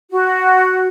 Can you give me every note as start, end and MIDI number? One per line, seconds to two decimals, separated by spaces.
0.11 0.88 66